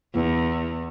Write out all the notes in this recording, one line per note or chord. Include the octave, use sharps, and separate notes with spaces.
E2